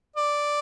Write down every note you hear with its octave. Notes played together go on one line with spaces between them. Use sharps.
D5